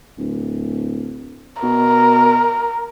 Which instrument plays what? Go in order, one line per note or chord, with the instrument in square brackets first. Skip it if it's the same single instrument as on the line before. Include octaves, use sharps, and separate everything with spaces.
[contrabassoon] D1
[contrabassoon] B2 [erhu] A#4